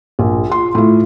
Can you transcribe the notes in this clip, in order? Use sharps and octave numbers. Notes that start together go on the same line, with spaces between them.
A#1
F4 C6
A2 F4